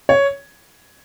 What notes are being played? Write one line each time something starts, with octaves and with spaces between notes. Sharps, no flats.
C#5